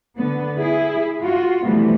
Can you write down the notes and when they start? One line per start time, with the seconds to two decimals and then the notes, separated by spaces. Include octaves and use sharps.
0.16 D3 B3
0.58 E4 G#4
1.22 F4 F#4
1.64 C3 E3 F3 G3 A3 B3